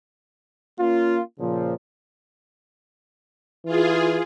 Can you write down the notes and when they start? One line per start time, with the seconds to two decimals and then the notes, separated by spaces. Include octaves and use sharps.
0.79 A#3 C#4 F4
1.39 A#2 C#3 F3
3.65 E3 F4 G#4